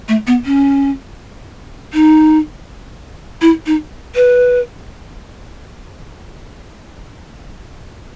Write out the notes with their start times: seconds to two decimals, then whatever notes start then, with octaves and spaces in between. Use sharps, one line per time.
0.08 A3
0.27 B3
0.45 C#4
1.93 D#4
3.42 E4
3.66 D#4
4.15 B4